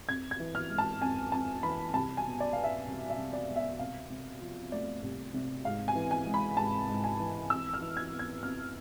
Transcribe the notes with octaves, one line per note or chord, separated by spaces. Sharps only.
F2 G#6
G#6
E3
F6
G#3
A5
F2 G#5
F2 A5
E3 B5
C2 A5
G#5
B2
D5
B3 F5
E5
C2
E5
C2
D5
B2
E5
C2 F5
C3
F3
A3 D5
C2
C3
G#2 F5
G#5
E3
G#5
G#3
B5
G#2 A5
G#2
G#5
E3
F2 E6
F6
E3
G#6
B3
G#6
F2 F6